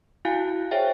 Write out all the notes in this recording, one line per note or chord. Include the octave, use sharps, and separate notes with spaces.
E4 F#4 F5 G#5 F#6
G#4 C5 C#5 E5 G5